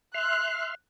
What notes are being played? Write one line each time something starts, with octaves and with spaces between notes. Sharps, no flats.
E5 C6 F6 F#6